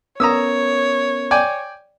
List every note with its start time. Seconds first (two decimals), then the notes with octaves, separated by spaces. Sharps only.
0.20 B3 C#4 A#4 C#5 A#5 D#6 E6
1.31 D5 G5 G#5